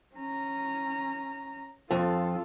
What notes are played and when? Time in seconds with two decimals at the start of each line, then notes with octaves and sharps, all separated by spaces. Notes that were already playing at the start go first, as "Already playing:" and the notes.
0.16 C#4 A#5
1.91 F2 F4 A4